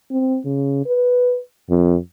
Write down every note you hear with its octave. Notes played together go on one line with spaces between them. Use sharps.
C4
C#3
B4
F2